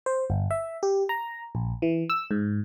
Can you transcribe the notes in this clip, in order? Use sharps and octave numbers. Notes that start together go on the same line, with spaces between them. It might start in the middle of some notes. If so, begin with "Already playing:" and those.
C5
G1
E5
G4
A#5
A#1
E3
E6
G#2